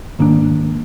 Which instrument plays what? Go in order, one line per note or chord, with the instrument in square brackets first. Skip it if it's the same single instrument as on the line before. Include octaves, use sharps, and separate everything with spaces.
[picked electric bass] G#2 D#3 A#3 D4